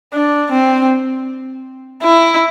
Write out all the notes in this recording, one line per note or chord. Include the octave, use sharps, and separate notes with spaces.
D4
C4
E4